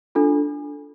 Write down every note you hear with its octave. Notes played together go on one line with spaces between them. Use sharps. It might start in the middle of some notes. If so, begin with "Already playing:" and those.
D4 F4 A4